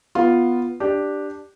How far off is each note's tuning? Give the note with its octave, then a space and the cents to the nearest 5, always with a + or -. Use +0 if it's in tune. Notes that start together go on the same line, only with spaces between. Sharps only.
B3 -5 F4 +0
D4 +0 G4 +0